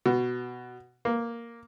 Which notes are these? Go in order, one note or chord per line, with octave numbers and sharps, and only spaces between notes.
B2
A#3